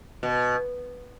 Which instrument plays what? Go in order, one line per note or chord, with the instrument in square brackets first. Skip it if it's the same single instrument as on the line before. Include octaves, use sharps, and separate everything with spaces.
[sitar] B2